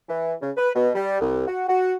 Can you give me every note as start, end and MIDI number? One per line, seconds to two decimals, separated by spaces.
0.09 0.33 52
0.41 0.51 49
0.57 0.69 71
0.75 0.89 47
0.95 1.21 55
1.21 1.46 36
1.48 1.68 66
1.69 1.94 66